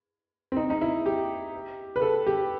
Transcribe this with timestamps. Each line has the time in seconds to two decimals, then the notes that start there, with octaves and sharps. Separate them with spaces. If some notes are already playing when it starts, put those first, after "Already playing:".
0.52 C4
0.57 D#4
0.70 D#4
0.81 E4
1.06 G4
1.96 B4
2.02 A4
2.27 G4